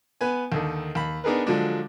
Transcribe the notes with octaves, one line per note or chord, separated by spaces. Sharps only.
B3 B4 G#5
D#2 D3 D#3
D#2 B5
B3 D4 D#4 G#4 A#4 B4
D3 F3 F#3 G#3 D4